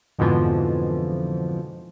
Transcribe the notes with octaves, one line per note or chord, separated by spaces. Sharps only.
F2 G#2 B2 D3 E3 F3